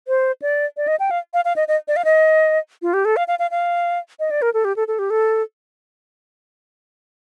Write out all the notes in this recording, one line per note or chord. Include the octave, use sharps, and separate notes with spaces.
C5
D5
D5
D#5
G5
F5
F5
F5
D#5
D#5
D5
F5
D#5
F4
G4
A4
F5
F5
F5
F5
D#5
D5
A#4
A4
G4
A4
A4
G4
A4